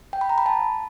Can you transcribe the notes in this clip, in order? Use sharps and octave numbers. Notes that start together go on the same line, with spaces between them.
G5
B5
A#5
B5
A5